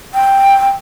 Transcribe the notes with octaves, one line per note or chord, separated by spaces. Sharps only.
G5